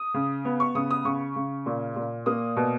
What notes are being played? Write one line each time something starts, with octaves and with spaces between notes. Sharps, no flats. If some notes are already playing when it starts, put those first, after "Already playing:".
Already playing: D#6
C#3
B3
C#6
C#3 D#6
D#6
C#3 C#6
C#3
A#2
A#2
A#3 D#6
B2